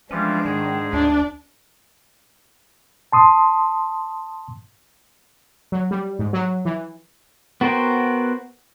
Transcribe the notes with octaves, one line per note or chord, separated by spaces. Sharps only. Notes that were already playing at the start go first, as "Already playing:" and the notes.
E3 F3 G3 G#3 C#4 D4
G#2 D#3 G#4
D2 D4 D5
A5 C6 D#6
F#3
G3
G#2
F#3
E3
B3 F#4 A#4 C5 G5